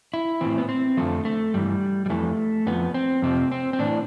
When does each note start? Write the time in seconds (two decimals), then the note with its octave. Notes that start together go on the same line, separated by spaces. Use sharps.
0.14 E4
0.41 A2 E3 C4
0.58 B3
0.69 C4
0.97 F2 D3 F3 A3
1.25 A3
1.54 G2 E3 G3
2.06 G3
2.10 F2 E3 A3
2.66 F2 D3 B3
2.71 F3
2.94 C4
3.22 F2 C3 F3 C4
3.52 C4
3.73 C4
3.79 A2 E3 D4